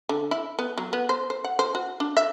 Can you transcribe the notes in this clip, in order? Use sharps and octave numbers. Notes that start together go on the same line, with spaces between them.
D3
E4
B3
F#3
B3
C5
C5
F#5
C5
F#4
D4
E5